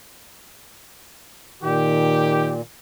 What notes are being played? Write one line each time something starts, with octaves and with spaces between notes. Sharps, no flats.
A#2 D#3 G4